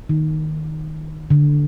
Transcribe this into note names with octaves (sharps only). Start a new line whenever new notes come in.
D#3
D3